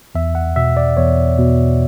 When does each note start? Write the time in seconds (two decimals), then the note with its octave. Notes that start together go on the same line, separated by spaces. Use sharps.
0.15 E2 E5
0.35 F#5
0.56 B2 E5
0.77 D5
0.97 E2 C#5
1.39 B2